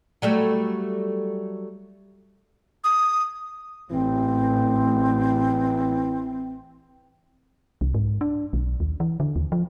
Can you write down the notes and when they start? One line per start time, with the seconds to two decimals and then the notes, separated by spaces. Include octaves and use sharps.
0.22 F#3 G3 A3
2.84 D#6
3.91 A1 E3 C4
7.81 C2
7.94 G#2
8.21 D4
8.53 B1
8.80 D#2
9.00 E3
9.20 D3
9.36 D#2
9.52 F3